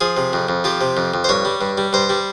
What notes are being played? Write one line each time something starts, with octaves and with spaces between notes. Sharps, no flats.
F3 G#4
C3
F2
F2
F3 G4
C3
F2
F2
C5
G2 C#5
G3
G2
G3
G2 C5
G3